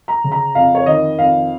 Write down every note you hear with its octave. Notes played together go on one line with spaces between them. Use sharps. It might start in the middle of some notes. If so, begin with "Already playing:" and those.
A#5
C#3
A#5
F2 F5
C#5
D#3 D#5
F2 F5